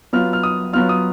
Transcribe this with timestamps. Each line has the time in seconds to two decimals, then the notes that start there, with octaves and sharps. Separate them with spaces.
0.13 F#3 B3 F4 F6
0.33 F6
0.43 D#6
0.73 F#3 B3 F4 F6
0.89 D#6